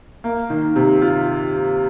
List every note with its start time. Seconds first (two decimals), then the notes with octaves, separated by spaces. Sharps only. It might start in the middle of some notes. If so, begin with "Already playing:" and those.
0.24 A#3
0.50 D#3
0.76 C3
1.02 F4